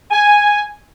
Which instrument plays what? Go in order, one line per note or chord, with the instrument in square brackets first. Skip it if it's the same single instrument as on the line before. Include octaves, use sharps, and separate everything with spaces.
[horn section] G#5